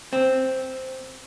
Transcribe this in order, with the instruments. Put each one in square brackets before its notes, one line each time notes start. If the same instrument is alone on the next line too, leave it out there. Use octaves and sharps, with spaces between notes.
[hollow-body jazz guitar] C4